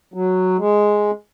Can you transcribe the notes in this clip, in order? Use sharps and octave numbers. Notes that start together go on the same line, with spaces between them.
F#3
G#3